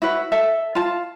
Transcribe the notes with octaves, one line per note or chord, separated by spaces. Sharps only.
E4 F#4 B4
A4 E5 A5
F4 A5